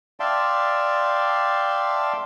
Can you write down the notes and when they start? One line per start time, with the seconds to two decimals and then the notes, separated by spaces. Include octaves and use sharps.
0.20 D5 E5 F5 G5 A5 C6